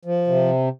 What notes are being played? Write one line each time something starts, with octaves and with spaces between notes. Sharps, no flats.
F3
C3